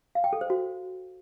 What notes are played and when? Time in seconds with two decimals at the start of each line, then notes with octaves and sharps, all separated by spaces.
0.15 F5
0.24 G5
0.33 A4
0.41 C5
0.50 F#4